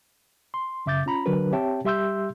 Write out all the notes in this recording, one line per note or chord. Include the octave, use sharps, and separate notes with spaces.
C6
F#2 C#3 E5 D6 G6 A6
C#4 F4 A#5 B5
D3 F#3 D4 F#4 A#4 B4
C4 G4 C#5 E5 G5 A5
G3 G4 E5 C6 E6 G6